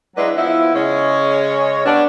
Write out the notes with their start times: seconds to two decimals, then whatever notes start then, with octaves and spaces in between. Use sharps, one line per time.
0.16 F#3 G#3 D4 E4 B4
0.37 F3 B3 E4
0.74 C#3 G#3 C#4 C#5
1.85 G3 B3 D4